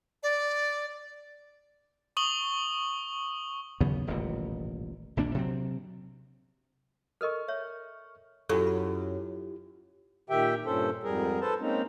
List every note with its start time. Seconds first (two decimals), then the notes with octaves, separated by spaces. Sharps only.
0.23 D5
2.17 C#6 D#6 F#7 G7
3.81 D#2 C#3 F#3 B3
4.07 D#1 A1 G#2 C3
5.17 A#1 D#2 A#3 D4
5.34 C3 F#3 C4
7.21 A4 A#4 D#5 C#6 F6
7.48 C#5 E5
8.49 F#2 E4 F4 G4 A4 C#6
8.67 B5
10.30 A#2 D#3 G4 E5 G5
10.66 G2 A#2 C#4 A4 C5
11.04 F2 G#2 G3 G#4 A#4
11.41 A4 B4 C5 A5
11.60 G#3 A#3 C4 C#4 D#4